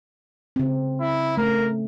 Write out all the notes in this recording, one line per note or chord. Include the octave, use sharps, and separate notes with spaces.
C#3 C4
E4
A3 C#4 A#4